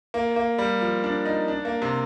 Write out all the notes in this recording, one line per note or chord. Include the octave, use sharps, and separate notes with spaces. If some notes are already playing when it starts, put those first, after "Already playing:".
A#3
A#3
G3
F3
D4
D#4
D4
A#3
C3